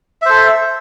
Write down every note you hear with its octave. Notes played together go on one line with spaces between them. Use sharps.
A4 C5 E5